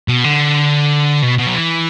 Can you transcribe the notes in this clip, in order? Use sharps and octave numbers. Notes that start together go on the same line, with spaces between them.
B2
D3
B2
B2
F#3
E3